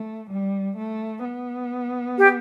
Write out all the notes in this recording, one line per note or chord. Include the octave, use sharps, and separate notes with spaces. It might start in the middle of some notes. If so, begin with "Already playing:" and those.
Already playing: A3
G3
A3
B3
G4